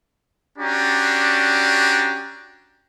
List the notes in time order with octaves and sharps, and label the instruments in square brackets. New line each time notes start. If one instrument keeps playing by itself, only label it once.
[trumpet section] C#4 D4 F#4 G4 D5 A#5